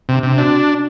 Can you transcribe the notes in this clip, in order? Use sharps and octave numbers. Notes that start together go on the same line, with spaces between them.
C3
D4
C3
D4 F#4